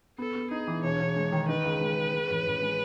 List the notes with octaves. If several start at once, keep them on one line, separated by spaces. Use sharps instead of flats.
B3 A4
B3
D#4 G#4
E3
E1 C#5
E1
G#3
D#3
D#4 B4
C#2
G#3
C#3
G#3
A1
A1
G#3